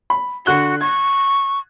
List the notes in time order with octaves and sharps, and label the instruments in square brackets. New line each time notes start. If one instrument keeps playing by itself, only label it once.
[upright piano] B5
[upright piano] D3 F#6 G7 [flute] F#4
[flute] C#6 [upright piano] G#6